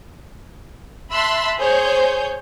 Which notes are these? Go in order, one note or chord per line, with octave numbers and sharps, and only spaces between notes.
E5 A5 B5 C6 E6 F#6
G#4 C5 C#5 G6